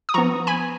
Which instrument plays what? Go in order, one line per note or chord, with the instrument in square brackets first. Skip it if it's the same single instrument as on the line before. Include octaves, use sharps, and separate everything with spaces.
[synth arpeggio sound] D#6
F3 B3 A#5 C#6
G#5 B5